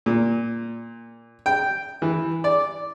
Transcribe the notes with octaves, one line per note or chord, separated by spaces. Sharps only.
A#2
G5
E3
D5